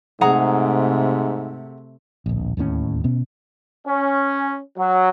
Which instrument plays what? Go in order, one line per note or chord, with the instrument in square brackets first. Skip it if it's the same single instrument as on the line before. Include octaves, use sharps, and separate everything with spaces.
[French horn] G#2 [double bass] C3 A3 [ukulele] G#4 F#5 A#5
[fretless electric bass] D1 A#1
D1 D#2 A2 C#4
B2 B3 C#4
[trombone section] C#4
F#3